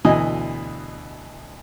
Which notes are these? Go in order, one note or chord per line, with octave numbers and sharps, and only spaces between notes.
D2 B2 E3 D#5 G#5 D#6